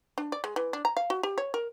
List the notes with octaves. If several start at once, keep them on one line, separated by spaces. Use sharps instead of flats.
D4
D5
G#3
E3
D4
A#5
F5
F#4
G4
C#5
A#4